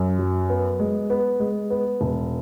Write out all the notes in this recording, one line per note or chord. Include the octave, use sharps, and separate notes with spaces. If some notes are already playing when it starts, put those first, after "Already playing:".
Already playing: F#2
F#3
B3
G#3
B3
G#3
B3
E1